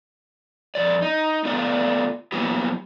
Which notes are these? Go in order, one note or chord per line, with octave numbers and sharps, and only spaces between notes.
F2 D5
D#4
A3 B3 F4 D5
F#3 A#3 B3 E4 G4